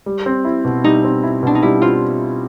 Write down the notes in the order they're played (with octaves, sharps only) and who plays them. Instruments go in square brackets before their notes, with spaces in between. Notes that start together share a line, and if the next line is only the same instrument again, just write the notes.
[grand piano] G3
C4
E4
B2
[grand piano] G3 [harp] D#4
[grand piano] C4
E4
[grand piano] B2 [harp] D4
[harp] D#4
[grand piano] G3 [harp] E4
[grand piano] C4 [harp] F4